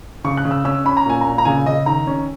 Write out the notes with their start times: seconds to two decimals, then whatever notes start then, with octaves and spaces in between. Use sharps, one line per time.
0.24 C#3 C#6
0.37 F#6
0.45 C#3
0.51 E6
0.64 C#4 E6
0.85 C#4 B5
0.97 A#5
1.06 A#2 G#5
1.21 A#2 A#5
1.38 A#5
1.45 C#3 G#5
1.66 C#3 D#5
1.86 D#3 A#5
2.07 C#4